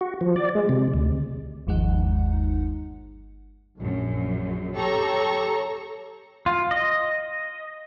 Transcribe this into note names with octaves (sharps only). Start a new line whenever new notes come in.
F#4
F3
D5
G#3
C3
D2
G1 D#2 F3 G#3 D#4 F#5
A#1 F#2
G4 A4 C#5 A#5 C#6
F4
D#5